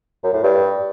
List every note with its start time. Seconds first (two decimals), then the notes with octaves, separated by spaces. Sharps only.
0.24 F#2
0.34 A2
0.43 G2